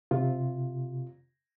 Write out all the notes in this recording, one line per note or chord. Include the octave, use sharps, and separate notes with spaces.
C3 F4